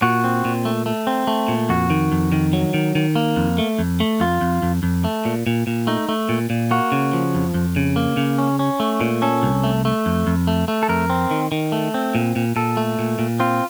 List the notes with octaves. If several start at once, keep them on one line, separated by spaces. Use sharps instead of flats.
A#2 F#4
C4
A#2
A3
A3
C4
A3
A#2
F2 F#4
D#3
F2
D#3
F#3
D#3
D#3
A#3
F2
A3
F2
A3
F2 F4
F2
F2
F2
A3
A#2
A#2
A#2
A3 D#4
A3
A#2
A#2
A#3 F#4
C#3
F3
F2
F2
C#3
A#3
C#3
C#4
C#4
A3
A#2
C#4 A4
C2
A3
A3
F2
F2
A3
A3
A4
F2 A#4
C4
D#3
D#3
A3
C4
A#2
A#2
A#2 A4
A3
A#2
A#2
C4 F4